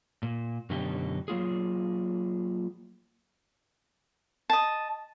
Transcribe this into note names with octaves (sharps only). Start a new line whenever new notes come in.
A#2
F#2 B2 D3 D#4 G4
F#3 A#3 F4 G#4
D#5 A5